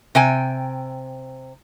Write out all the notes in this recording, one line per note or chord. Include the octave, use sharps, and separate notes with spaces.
C3 G5 G#5